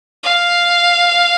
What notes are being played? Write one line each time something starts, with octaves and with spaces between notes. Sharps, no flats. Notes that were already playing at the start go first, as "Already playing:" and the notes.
F5